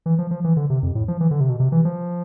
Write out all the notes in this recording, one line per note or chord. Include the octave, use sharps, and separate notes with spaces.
E3
F3
F3
E3
D3
C3
F2
A2
F3
E3
D3
C3
B2
C3
E3
F3